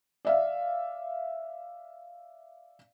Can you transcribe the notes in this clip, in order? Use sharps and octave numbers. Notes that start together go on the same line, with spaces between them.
D5 E5 F5